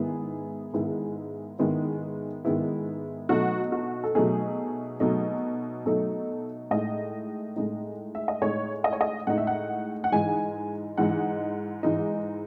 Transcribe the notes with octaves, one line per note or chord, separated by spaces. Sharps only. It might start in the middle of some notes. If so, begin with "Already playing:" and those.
Already playing: G#2 D#3 G#3 B3 E4 G#4
G#2 D#3 G#3 B3 E4
G#2 D#3 G#3 B3 E4
G#2 D#3 G#3 B3 E4
B2 F#3 A3 D#4 F#4
F#4
A4
B2 F#3 A3 D#4 G#4
B2 F#3 A3 D#4
B2 F#3 A3 D#4 A4
A2 G#3 D#4 D#5
A2 G#3 D#4
E5
D#5
A2 G#3 D#4 C#5
D#5
C#5
D#5
A2 G#3 D#4 F#5
E5
F#5
F#5
G#2 E3 G#3 D#4 G#5
G#2 E3 G#3 D#4 F#5
G#2 E3 G#3 D#4